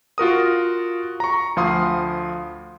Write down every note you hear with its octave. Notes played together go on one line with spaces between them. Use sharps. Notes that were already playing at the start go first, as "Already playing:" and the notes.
F4 F#4 A#4 D#6
A#5 C#6
D2 F3 F5 C6 D#6